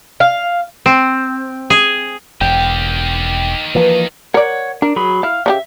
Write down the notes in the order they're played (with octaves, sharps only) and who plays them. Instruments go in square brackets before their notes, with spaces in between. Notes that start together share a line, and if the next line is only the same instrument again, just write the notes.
[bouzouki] F5
[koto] C4
G#4
[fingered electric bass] E1 [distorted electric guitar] D#3 G4 [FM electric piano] G5
[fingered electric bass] E3 F3 A#3 [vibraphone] B4
[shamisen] A#4 D5 [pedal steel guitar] C#5 F#5
[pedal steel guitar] D4 [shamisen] A#4
[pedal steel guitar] F#3 G#4 B5
[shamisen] E4 [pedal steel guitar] F5 F6
[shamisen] C#3 D4 G4 [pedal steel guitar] E5